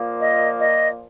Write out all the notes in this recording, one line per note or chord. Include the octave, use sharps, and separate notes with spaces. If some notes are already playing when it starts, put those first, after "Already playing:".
Already playing: A#2 F3 A#3
D#5
D#5